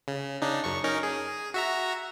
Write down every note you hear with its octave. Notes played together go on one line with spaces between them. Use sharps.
C#3
C#3 D4 D#4
F#2 C#6
C#4 D#4 A#4
G#4
F#4 E5 A#5